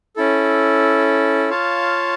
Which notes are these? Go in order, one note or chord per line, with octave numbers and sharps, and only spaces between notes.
C#4 E4 A4
F4 C#5 F5 A5